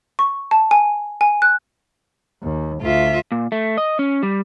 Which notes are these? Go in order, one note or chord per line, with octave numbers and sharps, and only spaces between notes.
C#6
A5
G#5
G#5
F#6
D#2
D2 F4 E5
A#2
A3
D#5
C#4
G3